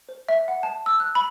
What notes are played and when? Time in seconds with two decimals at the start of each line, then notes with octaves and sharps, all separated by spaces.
0.09 C5
0.29 E5
0.48 F#5
0.63 A5
0.86 E6
1.00 F#6
1.15 B5